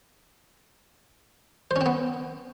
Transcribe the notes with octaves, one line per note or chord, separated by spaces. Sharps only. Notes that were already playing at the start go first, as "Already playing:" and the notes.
C5
C#4
C4
B3